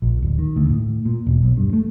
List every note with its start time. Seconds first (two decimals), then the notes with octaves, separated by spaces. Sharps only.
0.02 A#1
0.22 D1
0.38 D#3
0.56 D2
0.70 A2
1.05 A#2
1.27 E1
1.43 B1
1.57 G2
1.73 A3